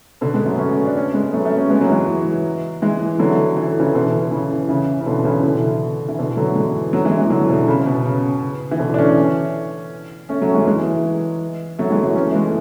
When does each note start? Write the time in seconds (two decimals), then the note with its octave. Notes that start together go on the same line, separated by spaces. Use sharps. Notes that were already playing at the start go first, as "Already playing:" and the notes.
0.21 B2 D3
0.34 G#3 B3
0.45 F#3 A3
0.58 A3 C#4
0.86 D4
0.95 A3 C#4
1.14 G#3 B3
1.33 F#3 A3
1.45 A3 C#4
1.58 A3 C#4
1.70 G#3 B3
1.81 F#3
1.89 E3 G#3
2.82 E3 G#3
3.19 D3 F#3
3.57 E3
3.68 D3
3.79 C#3 E3
3.95 B2 D3
4.31 C#3 E3
4.69 C#3 E3
5.00 C#3
5.06 B2 D3
5.25 C#3 E3
5.43 B2 D3
6.09 E3
6.18 B2 D3
6.37 D3 F#3
6.55 E3 G#3
6.93 D3 F#3
7.05 E3 G#3
7.17 E3 G#3
7.30 D3 F#3
7.49 B2 D3
7.68 C#3
7.86 B2
8.05 C#3
8.71 E3
8.79 B2 D3
8.94 D4
8.98 A3 C#4
10.29 A3 C#4
10.42 F#3 A3
10.54 E3 G#3
10.66 E3 G#3
11.79 F#3 A3
11.90 E3 G#3
12.03 F#3 A3
12.15 A3 C#4
12.30 A3
12.34 E3 G#3